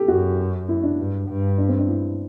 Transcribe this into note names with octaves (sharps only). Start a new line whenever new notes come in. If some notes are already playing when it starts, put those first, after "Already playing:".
Already playing: G4 A4
F#2 F#4
E4
D4
G2
G2
D4
C4
D4
E4